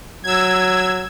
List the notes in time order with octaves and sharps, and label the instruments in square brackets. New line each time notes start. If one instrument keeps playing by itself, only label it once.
[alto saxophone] F#3 [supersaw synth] E6 G#6